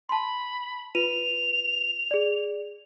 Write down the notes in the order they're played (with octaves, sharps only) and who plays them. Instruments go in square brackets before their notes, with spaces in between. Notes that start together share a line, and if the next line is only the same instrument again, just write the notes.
[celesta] A5 C6 [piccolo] B5
[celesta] F4 B4 D#7 [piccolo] F7
[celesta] G#4 D5